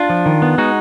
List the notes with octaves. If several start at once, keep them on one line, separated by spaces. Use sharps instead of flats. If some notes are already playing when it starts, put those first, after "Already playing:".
Already playing: D4 F4
F3
D#3
B3
G#3 D#4 F#4